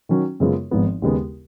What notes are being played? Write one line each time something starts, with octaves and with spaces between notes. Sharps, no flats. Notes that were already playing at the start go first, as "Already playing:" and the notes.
D#3 F#3 C#4 F#4
F#2 C#3 G#3 B3 F4
G#1 G#2 F3 B3
D#2 C#3 G#3 B3